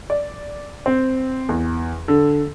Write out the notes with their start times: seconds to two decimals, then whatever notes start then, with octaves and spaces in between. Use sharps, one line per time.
0.10 D5
0.86 C4
1.49 E2
2.08 D3